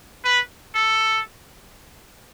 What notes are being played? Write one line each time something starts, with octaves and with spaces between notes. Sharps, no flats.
B4
A4